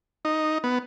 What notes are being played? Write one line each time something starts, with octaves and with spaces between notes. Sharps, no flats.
D#4
B3